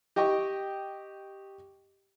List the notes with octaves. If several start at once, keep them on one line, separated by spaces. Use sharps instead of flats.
G4 D#5 G5 C#6